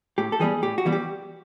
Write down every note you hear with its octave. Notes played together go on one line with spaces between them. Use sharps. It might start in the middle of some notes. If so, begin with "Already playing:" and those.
A2 G4
A4
E3 G3 B3 G#4
A2 G4
F#4
E3 G3 B3
G4